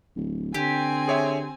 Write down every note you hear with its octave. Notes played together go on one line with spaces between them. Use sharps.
D1
D3 C4 G4 G#5
G#4 C#5 E5